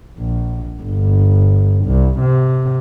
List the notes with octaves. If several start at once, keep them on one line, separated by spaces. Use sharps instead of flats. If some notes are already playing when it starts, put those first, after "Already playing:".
A#1
G1
C2
C3